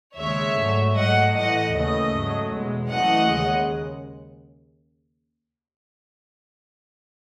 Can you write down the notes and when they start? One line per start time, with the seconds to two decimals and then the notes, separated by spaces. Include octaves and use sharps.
0.18 D#2 C#3 G#3 C#5 E5
0.57 G#2 F#3 A3
0.96 G#2 F#3 A3 D#5 F#5
1.35 A2 E3 A3 D#5 F#5
1.74 D#2 C#3 E3 A3 D#5
2.14 G#2 F#3 A3
2.52 E2 B2 G#3
2.91 F#2 E3 A3 D#5 F#5
3.30 D#2 C#3 G#3